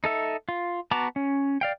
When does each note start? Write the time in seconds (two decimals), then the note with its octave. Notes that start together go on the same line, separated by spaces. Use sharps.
0.04 D#4 A4 E5
0.49 F4
0.91 B3 F#4 A5 A#5 D6
1.16 C#4
1.61 D5 F5 G5